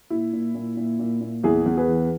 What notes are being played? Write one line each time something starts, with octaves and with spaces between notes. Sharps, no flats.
A#2 E4
A#2
A#2
A#2
A#2
A#2
E2 E4 G#4
E2
G#4 B4
E3